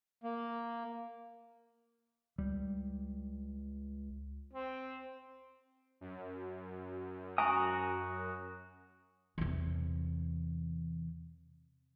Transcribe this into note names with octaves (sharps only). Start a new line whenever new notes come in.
A#3
C#2 G3
C4
F#2
F#4 G#5 A#5 D#6
E2 C3